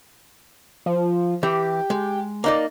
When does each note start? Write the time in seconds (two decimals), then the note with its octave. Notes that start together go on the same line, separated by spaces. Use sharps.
0.86 F3
1.43 E3 G4
1.90 G#3
2.44 A#3 D#4 D5